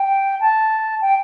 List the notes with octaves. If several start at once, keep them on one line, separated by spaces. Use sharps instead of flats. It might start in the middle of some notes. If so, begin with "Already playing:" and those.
Already playing: G5
A5
G5